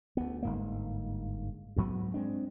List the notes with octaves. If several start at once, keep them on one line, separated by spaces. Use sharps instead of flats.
D2 B3
G1 G#2 A#3
D2 G#2 F#3 B3
G#3 C4 D4